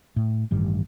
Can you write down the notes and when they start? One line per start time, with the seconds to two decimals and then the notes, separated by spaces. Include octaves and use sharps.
0.16 A2
0.51 A1 G2 D#3 G3